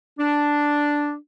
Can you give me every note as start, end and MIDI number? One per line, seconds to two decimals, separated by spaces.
0.18 1.14 62